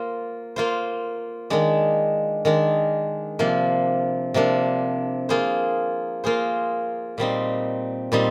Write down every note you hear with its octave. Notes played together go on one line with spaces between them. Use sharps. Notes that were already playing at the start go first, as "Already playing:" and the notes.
Already playing: A#3 F4 C5
A#3 F4 C5
D#3 G#3 D4
D#3 G#3 D4
C3 F3 A#3 D4
C3 F3 A#3 D4
A#3 F4 G#4 C5
A#3 F4 G#4 C5
A#2 G3 C4 D#4
A#2 G3 C4 D#4